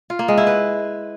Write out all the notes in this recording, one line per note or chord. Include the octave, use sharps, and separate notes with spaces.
F4
A#3
G#3
E4
B4